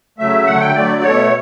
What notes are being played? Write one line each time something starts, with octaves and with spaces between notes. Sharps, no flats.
C#3 F#3 A3 E5
D3 F#3 A3 F#5
G5
D3 F#3 A3 D5
B2 A3 C#5